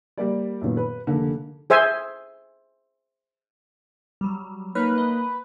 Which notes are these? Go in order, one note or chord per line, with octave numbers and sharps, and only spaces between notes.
G3 A#3 D5
F#2 A#2 D#3 B3
B4
F1 D3 A#3 A4
G#4 C5 E5 G#5
F#3 G3
A#3 D#4 B4 C#5 F6
D#5